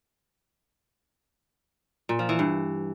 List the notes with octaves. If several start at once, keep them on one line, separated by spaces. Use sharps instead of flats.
A#2
F3
E3
G2